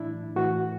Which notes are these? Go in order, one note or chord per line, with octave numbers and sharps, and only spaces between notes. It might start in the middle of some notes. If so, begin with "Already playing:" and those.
Already playing: A2 E3 D4 E4
A2 E3 F#4